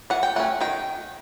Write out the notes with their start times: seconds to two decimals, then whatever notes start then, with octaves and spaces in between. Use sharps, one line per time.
0.10 E3 F#5
0.23 G5
0.36 A3 C#4 F#5
0.61 D#3 G5